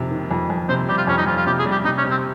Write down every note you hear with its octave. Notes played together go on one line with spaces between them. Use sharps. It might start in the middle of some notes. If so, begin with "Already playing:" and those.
Already playing: F2 C3 D#3
D#3
F2
F2
C3 C5
G3 G4
F4
F2 C#4
D#4
F2 F4
F4
C3 G4
G#4
G3
G4
C3 D#4
C#4
C3
C4